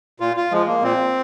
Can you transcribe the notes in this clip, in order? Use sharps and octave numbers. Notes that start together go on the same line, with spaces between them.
A#2 F4
F4
F3 G#3
A#3
A#2 C4